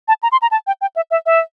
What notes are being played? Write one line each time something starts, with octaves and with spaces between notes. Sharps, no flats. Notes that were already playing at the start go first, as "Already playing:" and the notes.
A5
A#5
C6
A#5
A5
G5
G5
E5
E5
E5